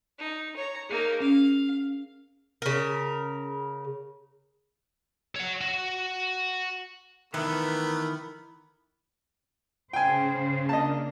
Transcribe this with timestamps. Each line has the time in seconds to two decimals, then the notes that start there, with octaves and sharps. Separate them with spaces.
0.19 D#4
0.57 C#5 A#5
0.90 A#3 D#4 G#4
1.21 C#4 F5
2.62 C#3 A#4
5.36 C#5 F#5
5.61 F#4
7.34 D#3 E3 A3 B3 E4 A#4 B4
9.93 C#3 C5 G5 G#5
10.69 A#3 D4 D#5 A5